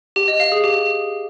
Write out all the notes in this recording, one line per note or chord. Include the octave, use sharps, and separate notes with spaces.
G4
D#5
F5
G#4
G4